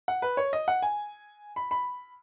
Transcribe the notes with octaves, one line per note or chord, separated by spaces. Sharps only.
F#5
B4
C#5
D#5
F#5
G#5
B5
B5